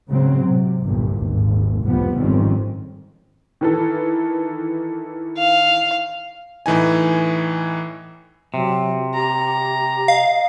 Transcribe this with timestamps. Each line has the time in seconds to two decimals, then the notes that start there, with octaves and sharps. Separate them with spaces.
0.10 G#2 C#3 F#3 C4
0.45 C3
0.84 G1 C2 G2 A#2
1.15 G#1 D#2
1.85 F1 C2 F3 G3 B3
2.19 G#1 F2 D#3 G3 C4 C#4
3.61 D#3 E3 A4
5.38 F5
6.66 A2 E3 D#4 G#5
8.54 C3 F#3
9.15 G4 A#5
10.08 D#5 F5